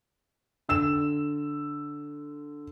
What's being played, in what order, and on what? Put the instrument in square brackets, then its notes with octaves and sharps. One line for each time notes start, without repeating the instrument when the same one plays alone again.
[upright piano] D3 E6 E7